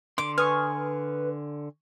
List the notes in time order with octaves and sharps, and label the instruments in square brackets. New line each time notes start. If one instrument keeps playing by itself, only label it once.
[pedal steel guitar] D3 C6 [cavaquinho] D6
[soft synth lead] B4 [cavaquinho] G#5 [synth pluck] C#6 D#6 F6